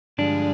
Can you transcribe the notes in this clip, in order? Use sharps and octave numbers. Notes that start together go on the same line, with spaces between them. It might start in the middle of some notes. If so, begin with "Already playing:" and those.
G2 D3 F3 G#3 D4